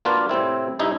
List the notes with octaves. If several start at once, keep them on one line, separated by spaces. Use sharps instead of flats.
A#3 D4 F4 F#4 B4
A2 C3 C4 E4
C2 G2 D#4 E4